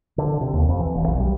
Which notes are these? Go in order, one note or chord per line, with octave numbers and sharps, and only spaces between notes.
D3
C3
D#2
F2
E3
E1
B1
G3